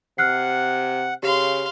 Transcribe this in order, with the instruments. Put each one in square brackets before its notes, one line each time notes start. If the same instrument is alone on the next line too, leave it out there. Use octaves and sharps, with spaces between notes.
[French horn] C3 [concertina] F#5 [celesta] F6 F#6 C7
[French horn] C#3 [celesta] G4 [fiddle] F5 C6